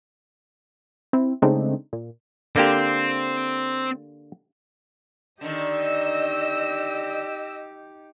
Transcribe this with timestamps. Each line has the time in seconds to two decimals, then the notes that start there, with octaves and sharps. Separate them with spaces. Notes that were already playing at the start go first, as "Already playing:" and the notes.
1.13 C4 E4
1.42 C#3 G#3 A3 C4 D4 D#4
1.93 A#2
2.56 D3 A#3 C4 G4
5.41 D3 D#3 D#4 G4 D#5 E6